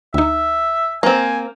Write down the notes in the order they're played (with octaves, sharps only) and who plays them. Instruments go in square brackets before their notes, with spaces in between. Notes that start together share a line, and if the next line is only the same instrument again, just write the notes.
[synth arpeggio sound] D2 D#4 [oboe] E5
[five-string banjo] A#3 C4 [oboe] G#5